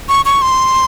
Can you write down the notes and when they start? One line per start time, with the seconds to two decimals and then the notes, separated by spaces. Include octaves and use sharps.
0.09 C#6
0.25 C#6
0.42 C6